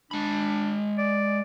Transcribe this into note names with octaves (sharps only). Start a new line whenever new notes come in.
G#3 D4 B5
D5